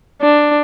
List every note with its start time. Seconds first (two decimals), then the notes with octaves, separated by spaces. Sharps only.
0.22 D4